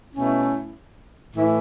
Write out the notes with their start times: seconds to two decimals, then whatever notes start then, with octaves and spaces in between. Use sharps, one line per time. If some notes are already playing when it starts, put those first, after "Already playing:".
0.13 B2 A3 C#4 E4
1.34 A2 E3 A3 E4